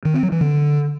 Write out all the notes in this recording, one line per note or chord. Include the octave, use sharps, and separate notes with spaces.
D#3
C4
F#3
E3
D3